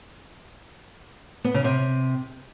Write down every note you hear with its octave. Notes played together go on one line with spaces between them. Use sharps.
B3
C#3
C3